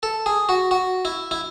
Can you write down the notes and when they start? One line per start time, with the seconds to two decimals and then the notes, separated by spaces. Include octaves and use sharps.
0.03 A4
0.26 G#4
0.49 F#4
0.71 F#4
1.05 E4
1.31 E4